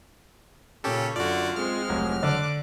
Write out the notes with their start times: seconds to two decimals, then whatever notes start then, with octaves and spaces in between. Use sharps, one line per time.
0.84 A#2 C#3 C#4 G4 A4
1.16 F#2 D3 F4 F#4 D5
1.56 G#3 C4 F6
1.89 F1 F#3
2.23 D3 D6 F#6